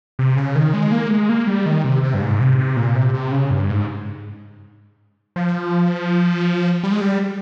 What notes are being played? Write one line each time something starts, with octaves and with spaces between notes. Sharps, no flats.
C3
C#3
D#3
G#3
A#3
G#3
A#3
G3
D#3
C3
C3
G2
G#2
C3
C3
A#2
C3
C3
C#3
G2
G#2
F3
G3
G#3
G3